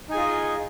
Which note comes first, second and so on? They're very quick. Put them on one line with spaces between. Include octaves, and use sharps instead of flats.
D#4 G#5 G#4 F4 D#5